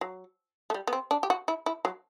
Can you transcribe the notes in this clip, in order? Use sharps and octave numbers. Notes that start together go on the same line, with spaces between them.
F#3
A3
G3
B3
C4
D4
G4
F#4
E4
E4
F#3